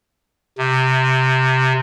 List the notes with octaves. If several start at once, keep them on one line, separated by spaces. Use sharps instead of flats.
C3